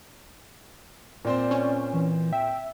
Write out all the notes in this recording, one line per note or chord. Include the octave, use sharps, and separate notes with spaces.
A#2 C4 C5 D5
C#4
E3
E5 G5